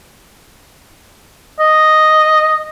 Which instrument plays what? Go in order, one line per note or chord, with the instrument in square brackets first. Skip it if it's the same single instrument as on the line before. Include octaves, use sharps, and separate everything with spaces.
[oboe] D#5